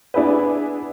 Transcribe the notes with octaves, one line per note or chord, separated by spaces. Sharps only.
B3 D4 E4 G#4 B4